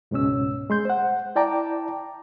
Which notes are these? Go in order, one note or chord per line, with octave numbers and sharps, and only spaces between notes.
C#2 G#2 B2 C#4 E6
G#3 C6 G6
C5 F#5
E4 D5 G5 A5 A#5 D6